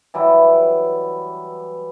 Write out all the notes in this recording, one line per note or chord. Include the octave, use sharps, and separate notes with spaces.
E3 F#3 G3 E4